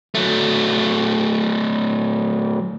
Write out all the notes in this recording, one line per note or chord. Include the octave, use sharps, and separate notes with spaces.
F#3 A3